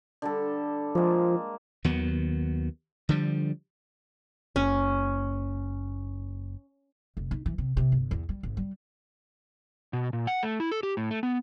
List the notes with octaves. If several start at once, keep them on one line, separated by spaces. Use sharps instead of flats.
D3 G3 A4
F3 G#3 A#3
D#2 D#3 F#3 B3
D3 F3 G3
F#1 C#4
F1
D#4
E3
C3
C3
G1
E2
G3
G#1
G3
B2
A#2
F#5
A3
E4
A4
G4
A2
A3
B3